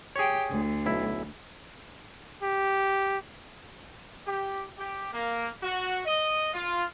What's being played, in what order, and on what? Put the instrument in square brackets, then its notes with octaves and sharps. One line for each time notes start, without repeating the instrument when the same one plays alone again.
[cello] G4 G5 [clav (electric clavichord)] G#4 C#5
[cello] D2
[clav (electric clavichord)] B1 E4
[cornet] G4
[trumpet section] G4
G4
A#3
F#4
D#5
F4